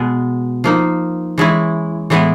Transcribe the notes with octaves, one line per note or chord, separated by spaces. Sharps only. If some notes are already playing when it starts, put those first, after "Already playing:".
Already playing: B2 G#3 B3
F3 A#3 D#4
E3 G#3 C#4 E4
A2 E3 G#3 B3 E4